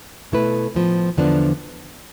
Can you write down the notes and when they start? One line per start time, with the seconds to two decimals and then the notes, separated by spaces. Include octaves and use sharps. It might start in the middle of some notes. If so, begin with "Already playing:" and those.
0.32 B2 A3 E4 B4
0.75 A2 F3 B3
1.17 E2 D3 F3 B3 D4